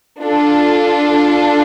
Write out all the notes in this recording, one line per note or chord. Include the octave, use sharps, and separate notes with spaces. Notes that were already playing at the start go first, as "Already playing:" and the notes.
D4 F4 A4